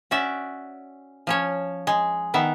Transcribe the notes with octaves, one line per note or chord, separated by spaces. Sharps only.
C#4 F#4 D5 E5
F3 C#4 C#5
G#3
D#3 B3 E5